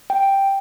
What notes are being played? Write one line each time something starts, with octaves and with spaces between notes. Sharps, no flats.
G5